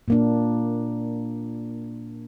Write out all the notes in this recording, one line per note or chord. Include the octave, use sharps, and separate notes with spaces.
A#2 A#3 D4